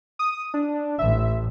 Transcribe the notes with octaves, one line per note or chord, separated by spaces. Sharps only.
D#6
D4
A1 E5